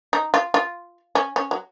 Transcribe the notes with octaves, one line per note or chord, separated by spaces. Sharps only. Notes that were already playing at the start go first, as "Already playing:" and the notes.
D#4
F4
F4
C#4
C#4
F#3